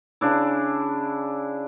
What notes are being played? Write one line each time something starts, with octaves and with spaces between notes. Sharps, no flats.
C#3 D4 E4